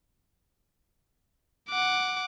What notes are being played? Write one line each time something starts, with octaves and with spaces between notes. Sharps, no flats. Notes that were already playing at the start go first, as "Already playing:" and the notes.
F#5 D6